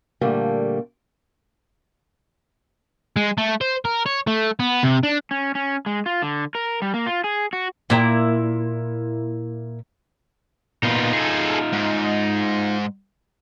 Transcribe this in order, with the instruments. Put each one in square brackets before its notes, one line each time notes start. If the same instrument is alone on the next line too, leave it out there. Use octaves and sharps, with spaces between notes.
[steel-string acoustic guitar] A#2 D3 G3 A3 A#3
[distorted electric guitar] G#3
A3
C5
A#4
C#5
A3
B3
C3
D4
[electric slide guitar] C#4
C#4
G#3
F4
D3
A#4
G3
A#3
F4
G#4
F#4
[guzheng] A#2 [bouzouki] A#3 E4 A#5
[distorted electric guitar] A#2 B3 [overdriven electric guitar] D#4 F4
[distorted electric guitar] G#4 A4
G#2